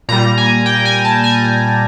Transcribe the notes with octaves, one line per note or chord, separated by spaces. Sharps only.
A#2 G3 A#5
G#5
G5
G#5
A5
G#5